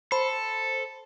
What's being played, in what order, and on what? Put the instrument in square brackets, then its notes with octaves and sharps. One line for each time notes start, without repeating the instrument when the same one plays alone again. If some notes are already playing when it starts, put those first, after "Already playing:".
[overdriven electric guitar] A4 [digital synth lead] C5 [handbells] B5